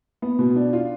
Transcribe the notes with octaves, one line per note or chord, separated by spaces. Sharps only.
B3
B2
D4
F4